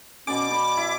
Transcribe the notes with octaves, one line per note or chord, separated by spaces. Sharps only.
B2 C#4 D5 G#5 D6
D5 B5
E4